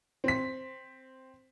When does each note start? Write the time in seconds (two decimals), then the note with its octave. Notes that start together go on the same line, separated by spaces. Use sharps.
0.24 C4 B6